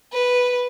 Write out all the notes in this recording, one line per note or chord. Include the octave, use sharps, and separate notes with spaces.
B4